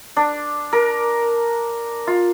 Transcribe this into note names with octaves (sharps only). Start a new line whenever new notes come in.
D4
A#4
F4